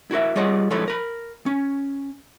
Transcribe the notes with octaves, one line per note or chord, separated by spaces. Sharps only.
E4 F#4 A#4 E5
G3 F4 G#4 C#5 D#5 F#5
F3 G#3 E4 A4 B4 C#5
A#4 B5
C#4